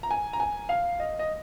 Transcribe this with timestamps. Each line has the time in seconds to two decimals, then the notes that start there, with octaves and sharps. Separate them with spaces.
0.03 A#5
0.11 G#5
0.33 A#5
0.40 G#5
0.69 F5
1.00 D#5
1.19 D#5